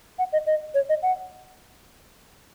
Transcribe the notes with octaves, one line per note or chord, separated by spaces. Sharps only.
F#5
D#5
D#5
C#5
D#5
F#5